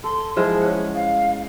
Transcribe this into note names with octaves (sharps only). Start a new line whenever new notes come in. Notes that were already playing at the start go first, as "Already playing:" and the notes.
A4 C6
F3 G#3 E4 G#4
C#4 F#5
F5